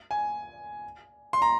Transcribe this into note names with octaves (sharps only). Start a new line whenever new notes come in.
G#5
C6
A#5